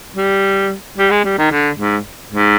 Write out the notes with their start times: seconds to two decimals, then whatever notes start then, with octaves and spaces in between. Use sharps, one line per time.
0.16 G3
0.98 G3
1.11 G#3
1.24 G3
1.38 D#3
1.51 D3
1.78 G#2
2.33 G#2